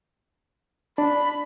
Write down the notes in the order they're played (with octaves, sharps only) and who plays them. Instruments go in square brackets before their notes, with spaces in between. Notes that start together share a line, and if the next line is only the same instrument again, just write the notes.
[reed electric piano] D4 [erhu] B5